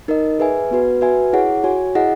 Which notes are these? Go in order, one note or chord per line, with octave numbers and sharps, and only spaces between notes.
D#4 A#4 D#5
G#4 B4 E5 G#5
B3 F#4 B4
F#4 B4 E5 G#5
E4 G#4 C#5 F#5
F#4 C#5 G#5
E4 G#4 D#5 F#5